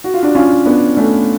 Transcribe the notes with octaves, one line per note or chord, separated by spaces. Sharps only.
F#4
F4
D4 F#4
C#4 F4
B3 D4
A3 C#4